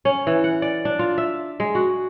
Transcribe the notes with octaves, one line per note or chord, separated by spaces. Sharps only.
C#4
E3
F#5
D5
D4
F4
E5
G#3
F#4